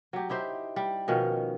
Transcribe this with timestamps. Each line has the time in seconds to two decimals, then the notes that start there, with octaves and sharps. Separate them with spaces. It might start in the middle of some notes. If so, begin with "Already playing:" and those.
0.13 F#3 G4
0.29 D#4 E4 G4 C5
0.76 G3
1.08 B2 D#3 F3 C#4